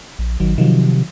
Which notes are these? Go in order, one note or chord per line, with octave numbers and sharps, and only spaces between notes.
A#1
G#1 D#3 F#3
C3 D#3 F3 F#3